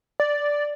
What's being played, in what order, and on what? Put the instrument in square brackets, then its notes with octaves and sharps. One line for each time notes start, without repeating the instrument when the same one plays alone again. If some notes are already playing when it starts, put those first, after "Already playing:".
[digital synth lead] D5